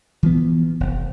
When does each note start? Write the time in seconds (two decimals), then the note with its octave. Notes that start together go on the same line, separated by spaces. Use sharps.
0.23 E3 F3 B3
0.80 F1